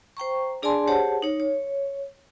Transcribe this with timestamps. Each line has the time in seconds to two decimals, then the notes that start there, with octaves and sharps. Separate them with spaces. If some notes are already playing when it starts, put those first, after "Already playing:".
0.17 C5 G5 A#5 C#6
0.62 D4 G#4 D5 G#5 A5 C6
0.87 G4 G#4 C5 C#5 F#5 A5
1.22 D#4 C#5
1.40 C#5